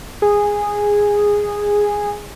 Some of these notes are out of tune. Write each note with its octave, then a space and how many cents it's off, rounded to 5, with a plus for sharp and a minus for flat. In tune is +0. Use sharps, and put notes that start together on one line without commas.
G#4 -10